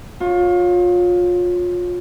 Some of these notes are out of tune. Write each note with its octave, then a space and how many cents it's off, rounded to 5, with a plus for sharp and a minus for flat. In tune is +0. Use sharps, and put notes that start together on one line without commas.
F4 +30 C#5 +0